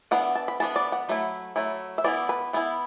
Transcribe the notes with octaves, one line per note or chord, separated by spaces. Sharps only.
E3 B3 D4 F#5
A5
B5
E3 B3 D4 A5
D5
F#5
F#3 A3 E4
F#3 A3 E4
E5
E3 B3 E4 D5
B4
E3 B3 E4